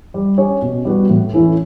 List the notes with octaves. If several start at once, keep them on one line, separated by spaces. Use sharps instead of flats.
G3
C#4 G4 C#5
B2
G3 B3 F#4
A2
E3 A3 C#4 E4